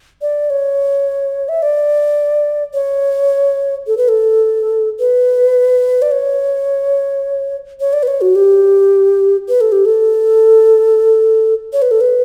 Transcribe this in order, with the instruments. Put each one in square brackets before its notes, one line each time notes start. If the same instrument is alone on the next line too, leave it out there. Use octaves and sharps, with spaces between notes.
[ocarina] D5
C#5
E5
D5
C#5
A4
B4
A4
B4
D5
C#5
C#5
D5
B4
C#5
F#4
G4
B4
A4
G4
A4
C#5
B4
A4
B4